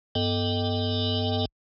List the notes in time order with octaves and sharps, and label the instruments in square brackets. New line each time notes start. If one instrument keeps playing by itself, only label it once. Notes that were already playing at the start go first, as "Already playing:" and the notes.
[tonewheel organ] G2 B3 A4 D#5 G5